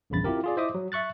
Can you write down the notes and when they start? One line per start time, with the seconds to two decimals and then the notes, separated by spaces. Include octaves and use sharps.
0.10 A#1 E2 G2 C#3 B5 A6
0.24 C4 E4 F4 G4 A#4
0.44 F4 G#4 D5
0.57 E4 C5 D#5 E5 D6 D#6
0.75 F#3
0.92 E5 C#6 F#6 A6